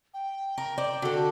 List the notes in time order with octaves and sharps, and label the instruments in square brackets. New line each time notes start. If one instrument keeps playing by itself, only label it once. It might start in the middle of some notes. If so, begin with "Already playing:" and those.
[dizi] G5
[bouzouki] A#4
C5 D5
[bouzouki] D3 A4 [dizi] F#4